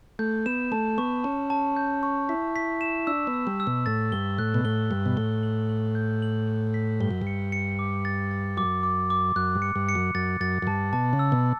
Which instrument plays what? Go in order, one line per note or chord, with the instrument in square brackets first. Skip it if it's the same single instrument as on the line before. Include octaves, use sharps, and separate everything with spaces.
[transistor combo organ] A3 [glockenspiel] G6
[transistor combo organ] B3 [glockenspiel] E7
[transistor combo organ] A3 [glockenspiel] A5
[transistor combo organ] B3 [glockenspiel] C#6
[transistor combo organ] C#4 [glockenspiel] A5
[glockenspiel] A5
G6
C#6
[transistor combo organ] E4 [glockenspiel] B6
[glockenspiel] B6
E7
[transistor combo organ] D4 [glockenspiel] E6
[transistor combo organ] B3
[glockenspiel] E6
[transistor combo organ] G3
[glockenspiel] E6
[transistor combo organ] B2
[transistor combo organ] A2 [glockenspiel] A6
[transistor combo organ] G2 [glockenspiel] G7
[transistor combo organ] A2 [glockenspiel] F#6
[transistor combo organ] B2
[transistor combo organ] A2 [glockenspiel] G7
[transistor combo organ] G2 [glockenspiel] F#6
[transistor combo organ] B2
[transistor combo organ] A2 [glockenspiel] G7
[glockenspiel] F#7
F#7
G6
F#7
F#7
B6
[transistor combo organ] G2 [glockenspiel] G7
[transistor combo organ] F#2
G2
[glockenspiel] C#7
C#7
D6
A6
A6
[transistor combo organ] F#2 [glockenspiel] D6
[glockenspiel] D6
D6
[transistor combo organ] F#2 [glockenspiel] F#6
[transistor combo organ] G2
[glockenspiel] C#7
[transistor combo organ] G2
[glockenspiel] C#7
[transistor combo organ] F#2
[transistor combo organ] F#2 [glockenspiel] A6
[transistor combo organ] F#2 [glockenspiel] A6
[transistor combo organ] F#2
[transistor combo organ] G2 [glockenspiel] A5
[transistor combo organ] B2 [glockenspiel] A5
[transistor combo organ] C#3
[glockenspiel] E6
[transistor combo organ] B2